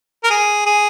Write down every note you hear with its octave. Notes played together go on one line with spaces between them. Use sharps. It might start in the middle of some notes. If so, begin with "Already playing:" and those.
A#4
G#4
G#4